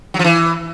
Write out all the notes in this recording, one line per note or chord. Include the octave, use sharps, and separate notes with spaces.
F#3
F3
E3